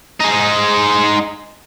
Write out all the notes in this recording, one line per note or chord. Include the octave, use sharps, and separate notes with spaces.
G#3 D#4